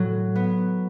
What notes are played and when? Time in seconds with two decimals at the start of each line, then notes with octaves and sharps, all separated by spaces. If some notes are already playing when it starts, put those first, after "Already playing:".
Already playing: A2 F#3 F#4
0.36 B3